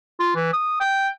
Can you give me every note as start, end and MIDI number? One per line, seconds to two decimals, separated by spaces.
0.20 0.33 65
0.36 0.53 52
0.53 0.76 87
0.81 1.09 79